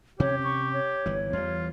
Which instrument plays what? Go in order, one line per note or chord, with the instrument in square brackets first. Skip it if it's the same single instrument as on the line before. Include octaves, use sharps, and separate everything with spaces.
[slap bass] C3 C#4 [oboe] G4 [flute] C#5
[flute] C#6
C#5
[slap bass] G1 E3
[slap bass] E2 G3 [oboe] F4